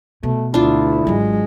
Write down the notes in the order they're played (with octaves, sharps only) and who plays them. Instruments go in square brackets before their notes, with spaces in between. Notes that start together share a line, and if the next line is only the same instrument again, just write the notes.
[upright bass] B2 [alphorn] A3
[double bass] D2 [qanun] D4 F4 [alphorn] E4
[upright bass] G#1 F#3 [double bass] G#3